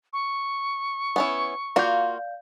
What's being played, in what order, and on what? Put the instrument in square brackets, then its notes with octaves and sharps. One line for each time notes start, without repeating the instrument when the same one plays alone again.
[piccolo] C#6
[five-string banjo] B3 C#4 E4
[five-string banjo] A#3 F4 F#4 [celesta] D5 F5 G6